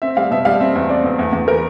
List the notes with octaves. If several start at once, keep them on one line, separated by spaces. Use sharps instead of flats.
C4 E5
G3 F5
B2 E5
G3 F5
C4 E5
E2
C4 D5
E2
E2
E2
E3 A#4